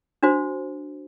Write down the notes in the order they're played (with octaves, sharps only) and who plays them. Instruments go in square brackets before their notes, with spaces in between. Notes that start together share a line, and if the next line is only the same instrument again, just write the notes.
[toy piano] D4 F#4 C5